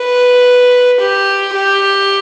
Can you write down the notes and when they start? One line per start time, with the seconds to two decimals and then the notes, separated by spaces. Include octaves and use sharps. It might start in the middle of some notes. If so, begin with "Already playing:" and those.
Already playing: B4
1.01 G4
1.56 G4